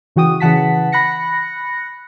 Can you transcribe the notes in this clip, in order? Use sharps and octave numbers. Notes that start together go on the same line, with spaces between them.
C#3 E3 F#4 G5 D#6
C#3 E3 F#5 A5 B6
B5 F#6 A#6 C#7